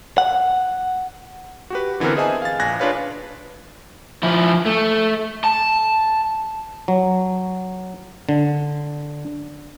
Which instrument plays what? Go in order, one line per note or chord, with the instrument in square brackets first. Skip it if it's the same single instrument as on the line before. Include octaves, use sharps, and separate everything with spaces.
[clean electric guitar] F#5
[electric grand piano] F#4 G4 B4
D3 E3 B3 C4 A#4
G#4 C5 D#5 E5 G#5 A5
F5 A6
A#1 G#5 F#6 G#6 A#6
D4 F4 G#4 B4 C#5 F5
[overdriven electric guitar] F3 E4
A3
A5
[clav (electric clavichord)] F#3
D3